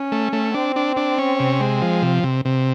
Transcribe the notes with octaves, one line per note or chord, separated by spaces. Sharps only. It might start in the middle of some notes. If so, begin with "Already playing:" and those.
Already playing: C#4
A3
A3
C4 D4
D4
D4
C#4
C3
G#3
F3
C3
C3
C3